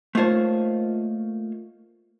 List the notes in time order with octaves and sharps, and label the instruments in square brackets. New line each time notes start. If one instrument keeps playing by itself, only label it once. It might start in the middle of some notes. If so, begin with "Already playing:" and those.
[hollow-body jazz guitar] A3 A#3 D#4 F4 C5 C#5